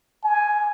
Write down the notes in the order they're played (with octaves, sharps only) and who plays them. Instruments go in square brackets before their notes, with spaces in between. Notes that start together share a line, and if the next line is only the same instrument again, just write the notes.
[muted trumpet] G#5